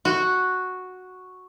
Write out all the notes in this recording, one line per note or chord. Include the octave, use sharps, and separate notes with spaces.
F#4